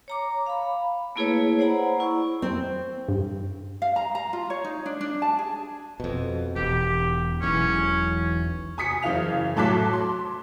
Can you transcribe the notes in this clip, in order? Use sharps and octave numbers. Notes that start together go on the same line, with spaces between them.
C#5 A#5 D6
F5 B5
A3 A#3 E4 G#4 B4 C#5
C5 D5 F#5 A#5 B5
E4 C#6
C4
G2
F5
A#5
A#5
F4
C#5
D#4
D4
D4
A5
G#4
F2 B2
E1 G4
E1 B1 E2 C#4
G#5 D#6 B6 C#7
F#1 E3 F5 F7
A2 F#3 A5 D6 F#6 B6
C6